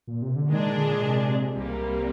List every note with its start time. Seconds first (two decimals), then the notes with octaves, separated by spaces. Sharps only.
0.08 A#2
0.22 C3
0.36 D3
0.49 A#2 D#3 G#3 D4 G#4
0.76 D3
1.02 C3
1.54 C2 C3 G3 A#3